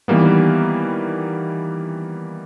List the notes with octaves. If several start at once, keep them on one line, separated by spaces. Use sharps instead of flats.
D#3 E3 G3 A#3 B3